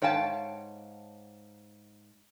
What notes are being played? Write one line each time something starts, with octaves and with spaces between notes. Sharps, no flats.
G#2 C#5 F5 G5 A5